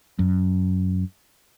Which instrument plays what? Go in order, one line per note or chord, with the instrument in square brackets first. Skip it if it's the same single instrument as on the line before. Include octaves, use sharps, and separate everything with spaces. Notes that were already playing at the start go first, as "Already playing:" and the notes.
[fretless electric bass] F#2